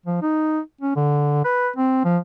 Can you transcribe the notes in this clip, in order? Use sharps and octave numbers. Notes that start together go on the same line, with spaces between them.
F3
D#4
C#4
D3
B4
C4
F3